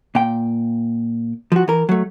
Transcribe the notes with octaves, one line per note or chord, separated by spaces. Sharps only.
A#2 G5
F3 F#4
E3 A#4
F#3 A3